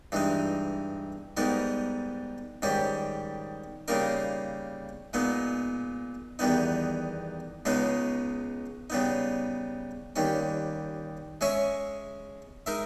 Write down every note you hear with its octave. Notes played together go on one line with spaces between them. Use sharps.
G2 E3 G#3 D#4
G#2 G3 B3 D#4 A#4
G#2 D#3 G3 C#4 G4
C#3 G3 A#3 D#4 A#4
A#2 G#3 B3 D#4
E2 D#3 G3 B3 D#4
C#2 C#3 G#3 B3 D#4
C#3 G3 B3 D#4
D#2 D#3 G3 C#4
G#3 C#4 G#4 C#5 E5
G#3 D#4 A#4 E5